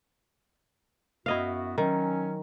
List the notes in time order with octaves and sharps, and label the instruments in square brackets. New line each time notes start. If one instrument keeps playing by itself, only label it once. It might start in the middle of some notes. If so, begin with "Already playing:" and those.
[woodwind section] F#2 B3 F#4 [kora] E4 D#5 F5
[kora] D#3 [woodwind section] F#3 C#4